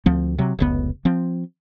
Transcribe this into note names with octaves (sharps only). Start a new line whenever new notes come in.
D2 F3 C4
C3 F#3
F1 C#2 B3
F3 C4